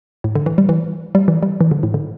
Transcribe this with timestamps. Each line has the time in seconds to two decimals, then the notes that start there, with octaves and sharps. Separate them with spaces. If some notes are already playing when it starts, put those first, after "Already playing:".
0.24 A2
0.35 D3
0.46 E3
0.58 G3
0.69 E3
1.15 G3
1.28 E3
1.43 G3
1.61 E3
1.71 D3
1.83 A2
1.94 D3